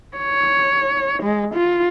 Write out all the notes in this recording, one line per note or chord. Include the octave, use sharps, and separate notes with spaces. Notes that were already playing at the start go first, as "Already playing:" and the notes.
C#5
G#3
F4